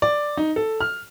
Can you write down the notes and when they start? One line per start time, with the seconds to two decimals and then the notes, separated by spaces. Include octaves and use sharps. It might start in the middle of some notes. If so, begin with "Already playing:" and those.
0.02 D5
0.37 D#4
0.56 A4
0.81 F6